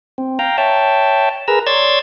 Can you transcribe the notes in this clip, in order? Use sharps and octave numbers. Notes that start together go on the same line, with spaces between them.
C4
F5 G5 A#5
C#5 E5 G5 A5
G#4 A#4 B4 A#5 E6
C#5 D5 C6 E6 G#6 A6